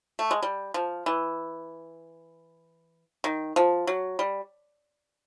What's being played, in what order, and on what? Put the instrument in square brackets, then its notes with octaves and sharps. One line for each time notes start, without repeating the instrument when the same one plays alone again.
[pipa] A3
G#3
G3
F3
E3
D#3
F3
F#3
G3